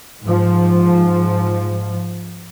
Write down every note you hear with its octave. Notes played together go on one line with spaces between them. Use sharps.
G#2 F3